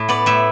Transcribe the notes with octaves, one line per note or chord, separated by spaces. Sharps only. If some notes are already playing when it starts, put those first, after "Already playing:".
Already playing: A2
B3 D5
A2 E5